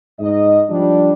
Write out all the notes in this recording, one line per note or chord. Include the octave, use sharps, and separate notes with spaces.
G#2 D#5
F3 G3 D4